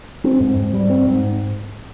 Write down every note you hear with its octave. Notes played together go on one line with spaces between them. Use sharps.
C4
G#2
G#2
G3
C4
G#2